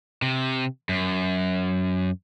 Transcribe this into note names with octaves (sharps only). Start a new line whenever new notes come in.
C3
F#2